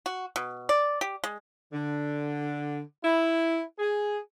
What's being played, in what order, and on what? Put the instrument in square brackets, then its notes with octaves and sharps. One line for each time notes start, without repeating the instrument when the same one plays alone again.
[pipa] F#4
B2
D5
G4
G#3
[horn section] D3
E4
G#4